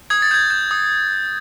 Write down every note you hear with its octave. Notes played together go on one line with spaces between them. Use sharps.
D#6 G#6
A6
G6 G#6
G6
D#6